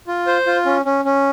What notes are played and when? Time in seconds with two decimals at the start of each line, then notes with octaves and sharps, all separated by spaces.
0.07 F4
0.27 C5
0.46 F4
0.66 C#4
0.85 C#4
1.05 C#4